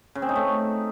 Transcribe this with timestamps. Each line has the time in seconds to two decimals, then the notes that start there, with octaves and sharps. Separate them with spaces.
0.15 C#3
0.22 C4
0.29 D#4
0.36 A3